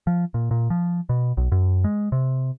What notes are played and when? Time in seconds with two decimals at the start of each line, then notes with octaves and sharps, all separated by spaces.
0.07 F3
0.34 A#2
0.51 A#2
0.70 F3
1.09 B2
1.37 B1
1.52 F#2
1.84 G#3
2.12 C3